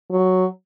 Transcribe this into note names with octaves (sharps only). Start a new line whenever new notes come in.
F#3